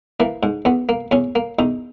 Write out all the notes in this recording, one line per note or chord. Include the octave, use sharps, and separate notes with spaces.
E3 A#3
G#2
E2 B3
A#3
E2 C#4
A#3
E2 D#4